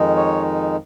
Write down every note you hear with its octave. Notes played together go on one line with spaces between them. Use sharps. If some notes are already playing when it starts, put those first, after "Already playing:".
Already playing: F2 D#3 G#3 D#4
C#5